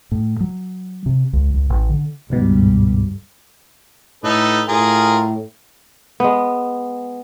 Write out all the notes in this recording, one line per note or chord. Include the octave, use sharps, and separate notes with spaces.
A2
F#3
C3
C#2
C#2
A1
D3
G1 C#2 G#2 B2 G3
A2 D#4 A4 B4
A2 F4 G#4 A#4
G#3 B3